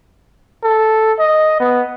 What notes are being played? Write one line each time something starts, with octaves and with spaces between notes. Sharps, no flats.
A4
D#5
B3